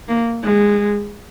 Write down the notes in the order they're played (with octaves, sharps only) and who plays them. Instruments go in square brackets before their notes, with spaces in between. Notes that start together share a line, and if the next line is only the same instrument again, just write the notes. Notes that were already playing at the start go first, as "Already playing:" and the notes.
[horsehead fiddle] A#3
G#3